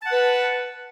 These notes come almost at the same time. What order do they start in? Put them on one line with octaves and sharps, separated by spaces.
A5 F#5 B4